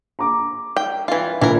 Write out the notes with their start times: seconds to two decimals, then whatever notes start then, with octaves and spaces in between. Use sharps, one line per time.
0.19 A#5 D6
0.77 G5
1.08 E3 F4 F5
1.41 A#1 A#2 E3 E4 A#4